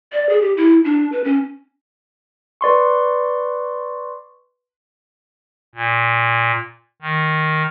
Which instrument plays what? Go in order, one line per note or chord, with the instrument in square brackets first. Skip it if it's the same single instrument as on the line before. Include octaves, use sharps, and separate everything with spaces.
[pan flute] D5
G#4
G4
E4
D4
B4
C#4
[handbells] B4 D5 C6 C#6
[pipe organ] A#2
D#3